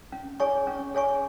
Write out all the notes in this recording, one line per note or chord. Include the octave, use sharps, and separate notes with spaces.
C#4
G#4 C#5 G#5 C#6
C#4
G#4 C#5 G#5 C#6